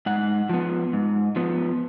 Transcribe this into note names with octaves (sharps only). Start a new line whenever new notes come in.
G#2 F#5
F3 B3
G#2
F3 B3